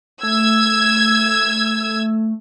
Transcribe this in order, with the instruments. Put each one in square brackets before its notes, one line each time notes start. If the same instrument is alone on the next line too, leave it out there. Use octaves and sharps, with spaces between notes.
[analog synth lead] A3 [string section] E6 G#6